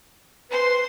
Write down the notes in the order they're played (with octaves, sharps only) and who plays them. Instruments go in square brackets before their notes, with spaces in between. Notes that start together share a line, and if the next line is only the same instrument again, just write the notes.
[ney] B4 [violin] C5 C6